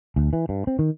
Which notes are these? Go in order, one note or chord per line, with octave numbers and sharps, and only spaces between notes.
D2
E3
G2
C4
D#3